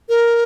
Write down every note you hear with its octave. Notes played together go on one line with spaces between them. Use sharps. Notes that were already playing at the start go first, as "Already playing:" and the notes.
A#4